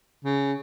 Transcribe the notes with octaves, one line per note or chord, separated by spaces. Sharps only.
C#3